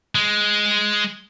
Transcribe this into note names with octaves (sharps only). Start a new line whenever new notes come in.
G#3